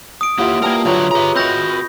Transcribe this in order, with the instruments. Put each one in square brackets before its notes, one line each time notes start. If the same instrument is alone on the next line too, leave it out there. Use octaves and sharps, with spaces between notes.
[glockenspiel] D#6 D7
[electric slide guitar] A#3 G4 [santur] E4 F4 F#5
[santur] G3 D4 B4 [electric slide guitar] A#3 A#4
[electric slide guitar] D3 F#3 A#5 [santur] F4 B4 C#5
[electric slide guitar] G4 A#5 [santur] G#4 B4 E5
[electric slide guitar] C4 F#4 [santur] D#5 [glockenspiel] B5 G6 A#6